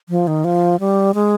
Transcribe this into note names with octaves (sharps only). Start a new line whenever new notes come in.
F3
D#3
F3
G3
G#3